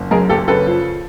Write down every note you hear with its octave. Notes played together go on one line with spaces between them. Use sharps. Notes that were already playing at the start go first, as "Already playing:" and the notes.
Already playing: F#1
F#2 G#4 A#4
F#1 G4 A4
C#3 A4 B4
F3